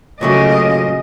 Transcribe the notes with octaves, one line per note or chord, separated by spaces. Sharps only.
A#2 C#3 F#3 A3 D#5